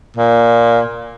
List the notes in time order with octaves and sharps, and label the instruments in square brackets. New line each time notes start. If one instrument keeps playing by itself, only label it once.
[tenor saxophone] A#2